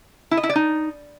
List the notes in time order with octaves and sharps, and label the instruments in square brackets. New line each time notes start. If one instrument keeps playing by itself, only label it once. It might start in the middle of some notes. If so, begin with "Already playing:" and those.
[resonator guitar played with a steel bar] E4
D#5
E4
D5
D#4